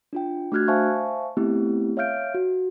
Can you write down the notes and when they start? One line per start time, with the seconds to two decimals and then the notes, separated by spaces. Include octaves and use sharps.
0.13 D4 F4 G5
0.52 A3 D4 F#4 F6 F#6 G#6
0.68 C5 E5 F5 G#5 A5 C#6
1.37 A3 B3 C4 E4 G4
1.97 C#5 E5 F5 F6 G6 D7
2.34 F#4